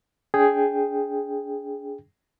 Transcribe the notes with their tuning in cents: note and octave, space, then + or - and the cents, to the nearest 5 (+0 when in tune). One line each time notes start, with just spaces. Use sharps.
D4 -40 G#4 +0 G5 +0